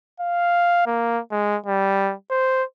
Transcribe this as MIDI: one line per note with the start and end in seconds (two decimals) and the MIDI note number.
0.20 0.85 77
0.86 1.20 58
1.32 1.57 56
1.66 2.14 55
2.30 2.63 72